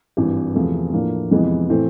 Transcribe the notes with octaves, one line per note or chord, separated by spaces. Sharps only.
G#1 G2 E3
E2 C3 F3 A3
A2 F3 A#3 D4
F2 C3 E3 G#3 B3
A2 E3 A3 C4